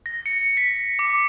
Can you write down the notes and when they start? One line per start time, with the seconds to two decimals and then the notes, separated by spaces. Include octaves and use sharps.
0.06 A#6
0.26 C#7
0.57 B6
0.99 D6